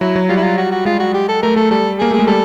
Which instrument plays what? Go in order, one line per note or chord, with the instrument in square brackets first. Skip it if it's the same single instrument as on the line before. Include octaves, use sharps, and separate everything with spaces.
[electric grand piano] F#3 [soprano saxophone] E4
[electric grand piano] F#3
[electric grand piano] G3 [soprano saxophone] F4
[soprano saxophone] E4
F4
F#4
F#4
[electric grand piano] G#3 [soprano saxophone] F4
[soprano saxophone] F#4
G4
A4
[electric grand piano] A3 [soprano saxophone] A#4
[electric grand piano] A3 [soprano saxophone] A4
[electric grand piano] G3 [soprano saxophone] A4
[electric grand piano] A#3 [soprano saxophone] G#4
[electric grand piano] A3 [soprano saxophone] G#4
[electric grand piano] G#3
[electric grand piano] G3 [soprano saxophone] A4